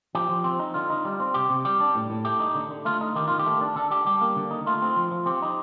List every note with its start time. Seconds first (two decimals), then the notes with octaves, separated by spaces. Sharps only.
0.15 F3 G4
0.29 F3
0.44 C4
0.59 D#4
0.74 D3 F4
0.90 D#4
1.05 G3
1.20 C4
1.34 C3 G4
1.50 C3
1.65 G3 G4
1.80 D4
1.95 A2
2.10 A2
2.25 A3 G4
2.40 D#4
2.55 D3
2.71 D3
2.85 A3 F4
3.01 D#4
3.15 D#3 G4
3.27 D#3 F4
3.39 G4
3.46 A3
3.61 D4
3.75 D3 A4
3.90 D4 G4
4.06 G3 G4
4.21 A#3
4.36 D3
4.51 D#4
4.66 A3 F4
4.82 C4
4.96 F3
5.11 F3
5.26 C4 G4
5.42 D#4